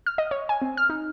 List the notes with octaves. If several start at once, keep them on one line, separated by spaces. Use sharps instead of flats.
F6
D#5
C#5
G#5
C4
F6
D#4